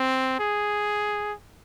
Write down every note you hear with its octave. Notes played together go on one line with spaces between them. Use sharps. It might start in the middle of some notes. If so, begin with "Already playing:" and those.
Already playing: C4
G#4